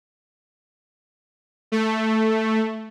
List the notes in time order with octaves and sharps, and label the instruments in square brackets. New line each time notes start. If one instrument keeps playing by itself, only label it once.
[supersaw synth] A3